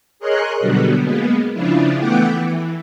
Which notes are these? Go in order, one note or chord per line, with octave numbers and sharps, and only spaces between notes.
G#4 A#4 C#5 D#5 C6 F#6
B2 D3 F#3 G3 B3
G#3 A#3 B3
C#3 F3 D4 E4 F4
E3 A3 B3 F#5 G5 D6
E3